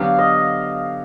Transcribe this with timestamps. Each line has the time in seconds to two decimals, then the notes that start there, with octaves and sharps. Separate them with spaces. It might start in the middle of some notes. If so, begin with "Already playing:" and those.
Already playing: D3 F#3 B3 D4 G4 F5
0.19 D#5